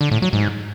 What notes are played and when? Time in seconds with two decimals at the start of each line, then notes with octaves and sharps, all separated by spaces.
0.01 D3
0.11 A2
0.22 F#3
0.33 G#2